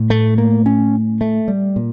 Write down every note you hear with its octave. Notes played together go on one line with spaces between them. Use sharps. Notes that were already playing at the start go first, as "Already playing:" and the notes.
Already playing: A2
A3
A#3
C#4
A3
G3
A#2